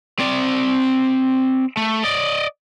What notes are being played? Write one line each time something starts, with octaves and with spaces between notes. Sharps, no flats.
C4 D5
A3
D5 D#5